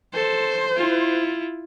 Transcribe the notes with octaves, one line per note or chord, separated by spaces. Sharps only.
A4 C5
E4 F4